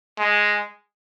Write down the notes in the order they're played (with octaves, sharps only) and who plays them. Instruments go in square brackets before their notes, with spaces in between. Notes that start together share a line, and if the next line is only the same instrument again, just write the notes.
[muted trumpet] G#3